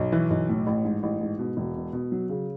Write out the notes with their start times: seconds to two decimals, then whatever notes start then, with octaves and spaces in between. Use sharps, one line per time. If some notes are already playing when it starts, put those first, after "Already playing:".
Already playing: B1
0.12 E3
0.30 B1
0.49 A2
0.67 A1
0.85 G#2
1.03 A1
1.21 G#2
1.39 B2
1.57 E1
1.75 B2
1.93 B2
2.12 F#3
2.29 C#3